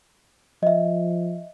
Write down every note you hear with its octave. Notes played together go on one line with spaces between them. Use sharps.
F3 D#5 E5